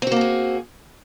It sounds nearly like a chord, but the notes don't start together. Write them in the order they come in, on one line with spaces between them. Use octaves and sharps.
C4 F#4 A#3 A4 G#4